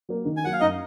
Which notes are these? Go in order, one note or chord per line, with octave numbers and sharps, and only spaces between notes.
F#3 A#3
D#3
G#5
F#3 A#3 F#5
F5
F#2 D#4 D#5